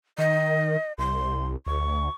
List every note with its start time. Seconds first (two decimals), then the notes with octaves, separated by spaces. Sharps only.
0.18 D#3 D#5
0.98 C2 C6
1.67 D2 C#6